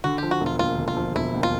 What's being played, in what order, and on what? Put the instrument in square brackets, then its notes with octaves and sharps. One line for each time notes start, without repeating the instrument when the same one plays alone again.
[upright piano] D3 [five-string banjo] F#4
[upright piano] F3 [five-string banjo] G4
[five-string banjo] F#4
[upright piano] E1
[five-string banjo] F4
[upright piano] D#2 [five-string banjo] F4
[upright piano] D3
[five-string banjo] F4
[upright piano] F3
[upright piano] E1 [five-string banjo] E4
[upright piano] D#2
[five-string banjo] F4